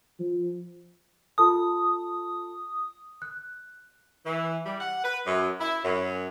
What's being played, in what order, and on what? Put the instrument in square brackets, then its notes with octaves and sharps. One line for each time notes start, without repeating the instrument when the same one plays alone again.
[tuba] F3
[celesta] F4 A4 A5 [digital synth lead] D#6
[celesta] F#6
[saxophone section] E3
G3
F#5
B4
F#2
E4
F#2